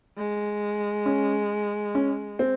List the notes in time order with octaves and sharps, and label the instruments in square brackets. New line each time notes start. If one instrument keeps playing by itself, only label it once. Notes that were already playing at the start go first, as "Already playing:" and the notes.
[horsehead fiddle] G#3
[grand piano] C#4
C#4
C4